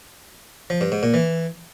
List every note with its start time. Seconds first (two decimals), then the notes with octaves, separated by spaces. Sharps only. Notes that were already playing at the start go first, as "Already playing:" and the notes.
0.70 F3
0.81 G2
0.92 G#2
1.03 A#2
1.14 E3